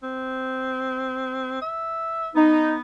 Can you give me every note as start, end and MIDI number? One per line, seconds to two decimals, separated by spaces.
0.03 1.58 60
1.62 2.29 76
2.35 2.81 59
2.35 2.73 63